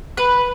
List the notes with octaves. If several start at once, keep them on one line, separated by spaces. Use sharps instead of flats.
B4